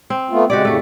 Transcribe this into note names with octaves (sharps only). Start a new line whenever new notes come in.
C4
A3 B3 F4
C#3 G#3 F#4 G4 D5
F2 A2 C#3 A3 F#4